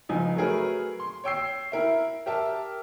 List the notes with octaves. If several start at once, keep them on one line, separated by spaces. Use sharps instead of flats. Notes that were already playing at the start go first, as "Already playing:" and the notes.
C#2 F3 D#4 G#5
F#3 A3 G#4 A#4 B4
C6
C#5 G5 E6 C7
E4 A#4 E5
G4 A#4 E5 A5